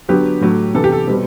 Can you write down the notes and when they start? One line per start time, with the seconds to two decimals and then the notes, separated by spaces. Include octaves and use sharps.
0.09 D3 F#3 B3 G4
0.41 A2 F#3 A3
0.74 C3 E3 B3 A4
0.84 G4
0.92 A4
1.07 B2 G3 C4